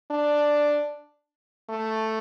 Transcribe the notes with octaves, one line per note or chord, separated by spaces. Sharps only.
D4
A3